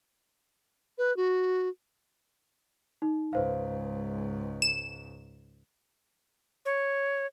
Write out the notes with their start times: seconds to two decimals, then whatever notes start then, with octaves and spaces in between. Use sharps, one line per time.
0.98 B4
1.17 F#4
3.02 D#4
3.33 C#2 G#2 B4 C5 F5
4.62 E7
6.65 C#5